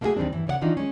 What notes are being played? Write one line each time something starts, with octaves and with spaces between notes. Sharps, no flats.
A3 A#3 D#4 E4 F#4 G#4
D#2 D#3 G3 C4 D4
G2 E3
C#3 C#5 D5 F#5
D#3 E3 D4 D#4 F4
G#3 C#4